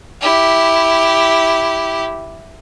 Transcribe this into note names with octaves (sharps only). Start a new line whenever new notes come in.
E4 G4